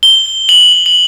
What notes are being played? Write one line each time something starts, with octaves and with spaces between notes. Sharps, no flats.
G7
F#7
F#7